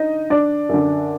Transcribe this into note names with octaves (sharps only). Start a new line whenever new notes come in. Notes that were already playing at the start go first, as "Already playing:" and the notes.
Already playing: D3 D#4 D#5
D4 D5
F#2 D3